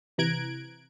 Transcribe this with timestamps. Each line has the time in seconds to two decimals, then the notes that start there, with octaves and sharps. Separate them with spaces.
0.18 C3 E3 A#5 F#6 G#6 D7